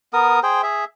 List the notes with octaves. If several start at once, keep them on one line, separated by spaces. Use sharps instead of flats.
B3 A#4 D#6
G#4 C5 G5
G#4 E5